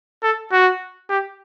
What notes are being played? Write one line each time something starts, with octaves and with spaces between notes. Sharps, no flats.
A4
F#4
G4